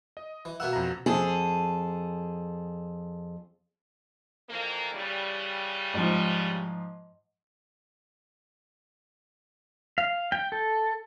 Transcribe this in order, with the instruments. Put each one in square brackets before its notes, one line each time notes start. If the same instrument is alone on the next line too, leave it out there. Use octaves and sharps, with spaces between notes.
[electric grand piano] D#5
[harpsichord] E3
[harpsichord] B2 A#3 F#5 [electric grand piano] E5 E6
[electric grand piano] F2 A#5
[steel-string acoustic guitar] F2 G#4 A4
[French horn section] F2 E3 A#3
C#3 E3 G3
[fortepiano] G#2 F3
[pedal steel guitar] F5
G5
A4